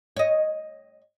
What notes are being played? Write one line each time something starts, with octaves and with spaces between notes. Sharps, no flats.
C#5 D#5